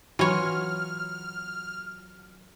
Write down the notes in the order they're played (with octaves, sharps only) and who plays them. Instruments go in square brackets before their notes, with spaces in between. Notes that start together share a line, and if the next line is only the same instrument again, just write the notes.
[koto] E3 C#5 [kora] F#3 F4 [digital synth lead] F6